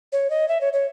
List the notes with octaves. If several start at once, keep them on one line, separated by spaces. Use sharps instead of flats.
C#5
D#5
E5
C#5
C#5